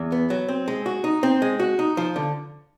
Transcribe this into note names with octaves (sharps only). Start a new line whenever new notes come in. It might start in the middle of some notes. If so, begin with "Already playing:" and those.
Already playing: E2
B3
F#3
C4
G#3
F#4
D#4
C4
G#3
F#4
D#4
F3
D3